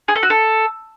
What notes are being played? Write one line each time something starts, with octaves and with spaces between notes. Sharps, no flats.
G#4
A4
F#4
A4